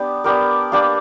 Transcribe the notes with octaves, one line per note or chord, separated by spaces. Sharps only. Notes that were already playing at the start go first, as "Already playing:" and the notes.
Already playing: B3 D4 G4
B3 D4 G4 A#4
A#3 D4 G4 B4